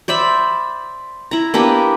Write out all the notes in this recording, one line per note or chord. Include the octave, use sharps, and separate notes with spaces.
C5 D5 E5 B5
E4 A#5
A#3 B3 D4 G4